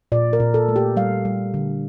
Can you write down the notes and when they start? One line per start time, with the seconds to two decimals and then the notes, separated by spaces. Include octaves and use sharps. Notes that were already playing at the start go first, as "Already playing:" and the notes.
0.12 A#2 D5
0.33 A#4
0.40 A#2
0.54 A4
0.69 A3
0.76 G4
0.97 G3 F5
1.25 G3
1.54 D3